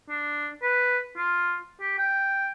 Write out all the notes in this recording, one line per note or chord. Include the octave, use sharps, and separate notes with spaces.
D4
B4
F4
G4
G5